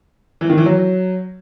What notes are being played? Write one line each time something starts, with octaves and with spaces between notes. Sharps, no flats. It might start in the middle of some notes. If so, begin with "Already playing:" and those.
E3
D#3
E3
F#3